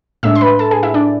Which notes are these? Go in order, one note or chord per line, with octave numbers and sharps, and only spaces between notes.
A2 G#3 D4 E5 E6
C6
B4 B5
A4 A5
G#4 G#5
E4 E5
D4 D5